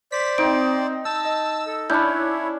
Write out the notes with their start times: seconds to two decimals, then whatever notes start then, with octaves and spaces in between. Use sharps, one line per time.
0.12 C5 D5 B6
0.38 C4 D#4 D7
1.05 A5 E6
1.25 D#5
1.67 A4
1.90 C#4 D4 E4 C#5 B5 G6